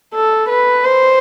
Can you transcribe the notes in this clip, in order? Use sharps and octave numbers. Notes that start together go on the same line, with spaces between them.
A4
B4
C5